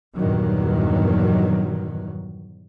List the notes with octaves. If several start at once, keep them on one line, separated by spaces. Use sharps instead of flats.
E2 G2 A#2 D#3 F#3